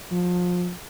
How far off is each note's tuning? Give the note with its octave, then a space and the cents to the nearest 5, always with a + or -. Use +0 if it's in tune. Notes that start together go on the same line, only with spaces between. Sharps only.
F3 +30